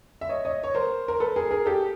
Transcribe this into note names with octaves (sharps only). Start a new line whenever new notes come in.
E5
C#5 D#5
C#5 D#5
C#5
A#4 C5
A#4
A4 B4
G#4 A#4
G#4 A#4
G4 A4